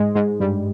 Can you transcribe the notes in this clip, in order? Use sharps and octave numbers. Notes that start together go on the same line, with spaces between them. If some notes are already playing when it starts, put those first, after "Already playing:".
Already playing: G#2 G#3
G#2 G#3
G2 G3